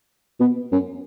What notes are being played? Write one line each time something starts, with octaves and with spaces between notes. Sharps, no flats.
B2
F#2